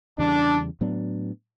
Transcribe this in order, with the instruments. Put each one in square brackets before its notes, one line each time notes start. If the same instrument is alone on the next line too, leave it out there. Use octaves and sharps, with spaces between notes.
[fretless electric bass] E2 C#3 E3 G3 [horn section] D4
[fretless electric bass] A2 F#3 B3 D4